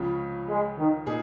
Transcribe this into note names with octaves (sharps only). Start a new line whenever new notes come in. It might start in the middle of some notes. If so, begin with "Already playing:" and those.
Already playing: C#2 C#3 F3 C#4 F4
G#3
D#3
A#2 A#3 D#4 G#4